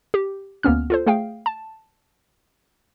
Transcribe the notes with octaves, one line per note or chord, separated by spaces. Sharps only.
G4
D2 A#3 B3 C#4 F6
F4 A4 C5
A3 G#4 F5 G5
A5